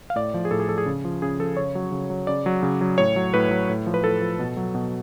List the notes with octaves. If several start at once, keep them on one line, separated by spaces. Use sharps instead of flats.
F5
A2 D5
F3
G#4
A2 A4
G#4
F3 A4
G#4
C#3
F3
C#3 G#4
F3 A4
C#3 C#5
F#3
C#3
F#3
C#3 D5
F#3
C#3
F#3
A2 C#5
F#3
A2 B4
F#3
A2
F3
B4
A2 A4
F3
B2
F#3
B2